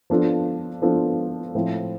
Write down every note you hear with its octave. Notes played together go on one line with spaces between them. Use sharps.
F3 B3 D4 F4 A4
F3 B3 D4 F4 A4
A2 F3 C4 E4